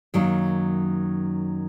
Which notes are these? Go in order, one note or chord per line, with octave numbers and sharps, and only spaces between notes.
F#2 D#3 F#3 A#3